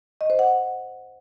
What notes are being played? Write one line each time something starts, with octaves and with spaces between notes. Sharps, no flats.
D#5
C5
F#5